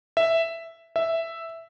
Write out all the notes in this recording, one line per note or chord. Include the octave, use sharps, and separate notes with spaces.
E5
E5